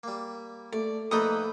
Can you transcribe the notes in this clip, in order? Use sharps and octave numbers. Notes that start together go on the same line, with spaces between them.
G3 A#3
A3 D5
A#1 A3 A#3 D#4 A4 B4 D#6